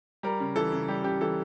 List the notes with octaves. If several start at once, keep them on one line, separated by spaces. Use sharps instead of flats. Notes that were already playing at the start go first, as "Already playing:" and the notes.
G3 A#4
C#3
E3 A4
C#3
G3 G4
C#3 G4
E3 A4